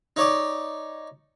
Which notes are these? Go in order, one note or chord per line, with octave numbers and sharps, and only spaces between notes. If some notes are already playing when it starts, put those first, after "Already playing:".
D#4 C#5 D5